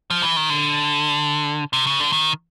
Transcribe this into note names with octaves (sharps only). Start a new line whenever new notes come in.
F3
E3
D#3
D3
C3
C#3
D3
D#3